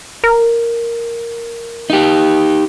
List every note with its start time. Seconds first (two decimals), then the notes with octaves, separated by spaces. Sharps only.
0.24 A#4
1.90 D#4 G4